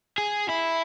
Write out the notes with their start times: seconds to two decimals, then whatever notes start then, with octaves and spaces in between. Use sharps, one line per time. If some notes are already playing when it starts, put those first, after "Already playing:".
0.18 G#4
0.50 E4